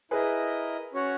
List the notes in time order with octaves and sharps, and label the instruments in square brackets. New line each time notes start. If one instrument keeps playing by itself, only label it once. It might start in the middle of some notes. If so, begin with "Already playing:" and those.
[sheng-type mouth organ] E4 A#4 D#5 [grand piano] G#4 B4
[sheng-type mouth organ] C#4 F#4 C#5 F#5